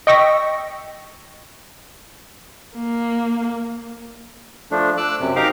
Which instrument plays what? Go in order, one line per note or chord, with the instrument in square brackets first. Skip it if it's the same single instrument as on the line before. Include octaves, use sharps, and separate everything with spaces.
[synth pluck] D#5 G5 C#6 E6 A#6 B6
[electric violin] A#3
[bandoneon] F3 A3 D4
D6 E6 F#6
F#2 C3
D#4 G4 A#4 F5 A#5 D6